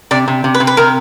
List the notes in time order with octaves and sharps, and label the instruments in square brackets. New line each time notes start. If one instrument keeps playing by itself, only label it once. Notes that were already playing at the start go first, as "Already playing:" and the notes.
[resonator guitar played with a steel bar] C3 [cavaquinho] D5
[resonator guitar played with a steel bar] C3
C3
[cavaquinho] B4
[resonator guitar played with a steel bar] C3
[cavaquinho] B4
[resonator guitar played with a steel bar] C3 [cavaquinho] A#4